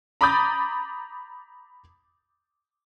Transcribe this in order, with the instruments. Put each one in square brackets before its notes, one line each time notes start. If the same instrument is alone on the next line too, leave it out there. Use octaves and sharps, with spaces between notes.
[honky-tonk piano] A#5 B5 D6 D#6 G6 A6